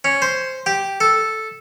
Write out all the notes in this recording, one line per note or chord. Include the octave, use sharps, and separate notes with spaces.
C#4
C5
G4
A4